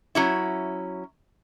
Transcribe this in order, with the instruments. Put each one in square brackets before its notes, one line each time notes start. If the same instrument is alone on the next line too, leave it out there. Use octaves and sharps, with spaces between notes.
[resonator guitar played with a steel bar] F#3 C#4 E4